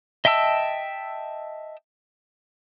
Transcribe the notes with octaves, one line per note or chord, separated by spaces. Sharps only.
D#5 E5 G5 A5 E6